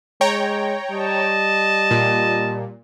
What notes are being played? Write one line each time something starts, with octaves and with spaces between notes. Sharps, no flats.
G#3 C#5 G5 A#5
G3 D#5 A5
A#2